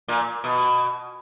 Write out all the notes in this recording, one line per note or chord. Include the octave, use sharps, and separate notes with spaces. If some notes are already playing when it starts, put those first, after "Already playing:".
A#2
B2